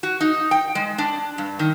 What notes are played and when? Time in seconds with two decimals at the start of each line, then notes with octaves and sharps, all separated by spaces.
0.03 F#4
0.21 D#4
0.51 G5
0.75 G#3
0.98 D4
1.38 G2
1.59 D#3